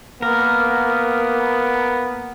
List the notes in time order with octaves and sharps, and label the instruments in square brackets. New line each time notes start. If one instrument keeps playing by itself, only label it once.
[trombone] A#3 [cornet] B3 [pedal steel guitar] A#4